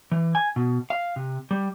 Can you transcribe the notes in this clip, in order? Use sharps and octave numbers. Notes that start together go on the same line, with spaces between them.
E3
G#5
B2
F5
C3
G3